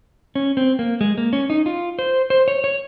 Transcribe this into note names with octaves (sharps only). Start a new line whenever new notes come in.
C#4
C4
A#3
G#3
A#3
C#4
D#4
F4
C5
C5
C#5
C#5